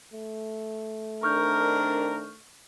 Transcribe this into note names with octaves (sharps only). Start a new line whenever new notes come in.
A3
D#3 C4 D4 A#4 C#6 F6 G6